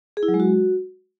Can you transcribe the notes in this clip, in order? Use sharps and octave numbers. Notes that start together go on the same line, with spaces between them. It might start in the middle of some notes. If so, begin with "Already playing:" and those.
G#4
E4
F#3
G#3
F#4